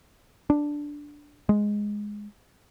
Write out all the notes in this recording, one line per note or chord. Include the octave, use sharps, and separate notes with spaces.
D4
G#3